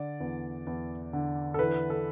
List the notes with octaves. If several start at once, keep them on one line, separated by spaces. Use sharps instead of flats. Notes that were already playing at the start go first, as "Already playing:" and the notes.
Already playing: D3 D5
E2
E2
D3
A4
E3 B4
A4